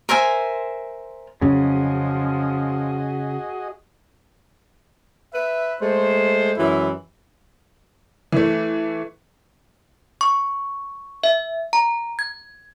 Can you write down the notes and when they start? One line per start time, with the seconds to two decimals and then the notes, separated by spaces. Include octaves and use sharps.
0.09 A#4 C5 E5 G#5
1.41 F2 C#3 F3 F#3 C#4 F#4 G#4 D#5
5.33 B4 E5
5.81 G#3 A3 C5
6.56 F#2 E3 G#3 E4
8.32 E3 A3
10.21 C#6
11.24 E5
11.73 A#5
12.19 G#6